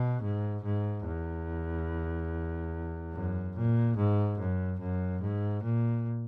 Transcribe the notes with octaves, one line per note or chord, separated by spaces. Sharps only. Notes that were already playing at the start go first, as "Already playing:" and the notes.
Already playing: B2
G#2
G#2
E2
F#2
A#2
G#2
F#2
F#2
G#2
A#2